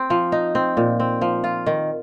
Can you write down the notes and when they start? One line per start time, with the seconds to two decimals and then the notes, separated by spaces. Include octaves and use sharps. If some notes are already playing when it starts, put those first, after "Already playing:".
Already playing: C4
0.10 F3
0.32 D#4
0.55 C4
0.77 A#2
1.00 C4
1.21 F3
1.44 F4
1.66 D#3